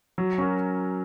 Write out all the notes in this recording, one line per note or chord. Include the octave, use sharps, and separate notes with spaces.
F#3
C#4 F#4 A#4